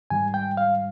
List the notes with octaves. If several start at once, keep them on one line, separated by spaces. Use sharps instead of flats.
G#2 D#3 G3 G#5
G5
F5